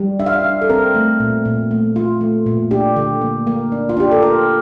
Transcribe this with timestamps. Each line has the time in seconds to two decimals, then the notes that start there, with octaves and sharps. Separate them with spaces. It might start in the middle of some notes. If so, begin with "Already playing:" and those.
Already playing: G3
0.19 D4 E5
0.26 F5
0.33 E5
0.44 D4
0.61 A4
0.69 C4 A#4
0.95 A3
1.20 A#2
1.45 A#2
1.71 A3
1.96 F4
2.21 A3
2.46 A#2
2.71 D4 G4
2.96 D3
3.21 A#3
3.47 A#3
3.72 D4
3.89 F4
3.97 D4 G4
4.11 A4
4.22 F4 A#4